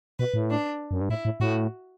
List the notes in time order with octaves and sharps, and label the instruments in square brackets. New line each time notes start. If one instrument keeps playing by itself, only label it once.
[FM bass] B2 [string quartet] B4
[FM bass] A2
[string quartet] D4
[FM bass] F#2
G2
[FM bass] A2 [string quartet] E4
[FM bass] A2
[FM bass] A2 [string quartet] F#4